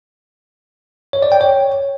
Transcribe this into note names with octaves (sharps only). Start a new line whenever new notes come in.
C#5
D5
G5
C#5